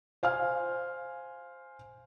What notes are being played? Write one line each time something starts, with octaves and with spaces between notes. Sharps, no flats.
C5 F5 G#5 F6